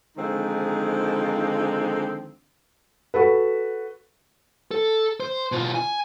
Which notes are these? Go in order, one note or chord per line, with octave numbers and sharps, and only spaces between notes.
D3 D#3 F3 G#3 C4 D#4
F#4 A4 B4
A4
C5
B2 F4
G#5